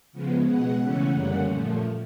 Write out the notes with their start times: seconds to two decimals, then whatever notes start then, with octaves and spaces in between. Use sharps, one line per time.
0.13 C#3 F3 G#3 B3
0.46 B2 G#3 B3 F#5
0.81 C#3 E3 A3 C#4
1.14 F#2 D3 G3 A#3 C#4
1.48 A#2 F3 A3